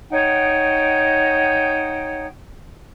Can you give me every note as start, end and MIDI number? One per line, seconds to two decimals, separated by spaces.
0.10 2.26 63
0.10 2.26 73
0.10 2.26 78
0.10 2.26 79